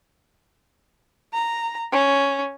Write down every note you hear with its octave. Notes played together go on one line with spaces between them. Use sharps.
A#5
C#4